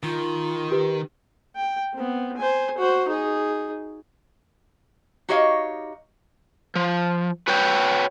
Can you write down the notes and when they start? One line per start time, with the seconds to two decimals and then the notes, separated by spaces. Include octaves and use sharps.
0.03 D#3 F4
0.71 G4 B4
1.56 G5
1.94 B3 C4
2.37 C5 G#5
2.78 F#4 C5
3.08 D#4 G#4
5.29 D#4 F#4 G4 C#5 D#5 F5
6.75 F3
7.48 F#4 B4 C#5 G5